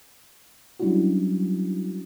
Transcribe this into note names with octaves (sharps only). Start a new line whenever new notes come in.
F#3 G3 C#4 D4 E4 F#4